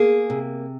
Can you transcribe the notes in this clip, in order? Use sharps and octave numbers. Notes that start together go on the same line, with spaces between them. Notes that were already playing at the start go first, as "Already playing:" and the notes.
Already playing: A#3 G#4
C3